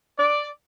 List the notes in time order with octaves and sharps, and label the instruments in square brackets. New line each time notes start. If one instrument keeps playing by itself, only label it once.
[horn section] D5